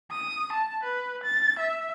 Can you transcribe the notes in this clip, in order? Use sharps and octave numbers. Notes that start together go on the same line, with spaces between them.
D#6
A5
B4
A6
E5